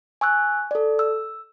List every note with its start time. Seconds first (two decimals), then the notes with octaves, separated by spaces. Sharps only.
0.21 G#5 C#6 E6 F#6
0.71 A4 D5
0.99 E6